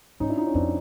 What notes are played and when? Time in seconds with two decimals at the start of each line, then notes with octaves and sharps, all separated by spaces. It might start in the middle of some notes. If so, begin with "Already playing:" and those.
0.20 G#2 C#4 D#4
0.29 D4 E4
0.37 D#4 F4
0.47 C#4
0.54 F2 C4 D4